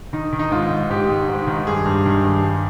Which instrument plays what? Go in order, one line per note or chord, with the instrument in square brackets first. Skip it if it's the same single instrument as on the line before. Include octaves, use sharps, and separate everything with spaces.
[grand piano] D#3 D#4
D#3
D#4
G#2 F4
D#3
G#2 G4
G#2
G#2
D#3
G2 G#4
G2
D#3
G2
G2